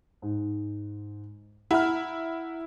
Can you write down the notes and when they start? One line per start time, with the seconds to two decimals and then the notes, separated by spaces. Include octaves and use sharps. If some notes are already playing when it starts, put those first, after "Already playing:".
0.22 G#2
1.71 E4 F#5 A#5 F6